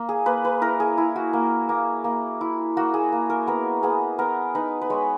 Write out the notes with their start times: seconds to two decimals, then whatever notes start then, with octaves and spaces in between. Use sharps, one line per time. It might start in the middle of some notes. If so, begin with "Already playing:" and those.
Already playing: A#3
0.09 G#4
0.26 A#3 B4
0.45 B4
0.61 E4 A#4
0.80 G#4
0.98 E4
1.16 F#4
1.33 A#3
1.69 A#3
2.04 A#3
2.41 E4
2.77 A#3 F#4
2.94 G#4
3.12 A#3
3.30 A#4
3.47 B3 A#4
3.83 B3 G#4
4.18 B3 A#4
4.55 D#4 B4
4.82 B4
4.90 G#3 C#5